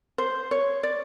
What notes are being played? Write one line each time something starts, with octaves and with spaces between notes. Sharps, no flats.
C5
C#5
D5